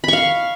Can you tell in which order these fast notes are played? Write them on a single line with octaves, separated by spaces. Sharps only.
B5 C#6 F5